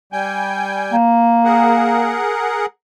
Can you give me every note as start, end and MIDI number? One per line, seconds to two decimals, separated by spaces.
0.13 0.96 55
0.13 0.96 79
0.13 0.96 80
0.92 2.17 58
1.45 2.66 68
1.45 2.66 70
1.45 2.66 78